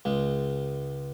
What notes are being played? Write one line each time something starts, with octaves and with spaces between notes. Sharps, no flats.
C#2 G#3